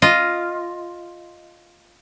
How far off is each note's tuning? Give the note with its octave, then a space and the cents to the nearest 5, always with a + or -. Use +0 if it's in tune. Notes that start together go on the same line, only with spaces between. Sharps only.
F4 +0 D#5 +0